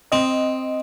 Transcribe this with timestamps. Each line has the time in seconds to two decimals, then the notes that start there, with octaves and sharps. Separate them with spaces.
0.12 C4 D#5